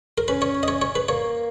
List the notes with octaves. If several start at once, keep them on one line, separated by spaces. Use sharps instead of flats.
A#4
C#4 B4
C#5
D#5
C#5
C#5
B4
A#3 C#5